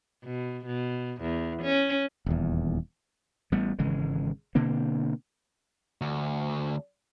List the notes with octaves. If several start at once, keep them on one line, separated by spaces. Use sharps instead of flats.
B2
B2
E2
C#4
D#1 E2
A1 G3 B3
G#1 C#3 E3 G#3
B2 D3 A#3 C4
D2